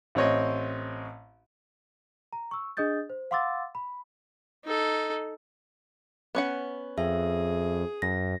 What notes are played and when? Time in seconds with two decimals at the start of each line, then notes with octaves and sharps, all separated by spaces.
0.15 A1 C4 C#5 D#5
2.33 A#5
2.51 C#6 E6
2.77 D4 G#4 D#5 D#6 G6 A6
3.10 C5
3.31 F5 F#5 C6 D6 E6 A6
3.75 B5
4.65 D#4 A4
6.35 B3 C#4 F#5
6.98 F2 G#4 E5
8.02 F#2 A#6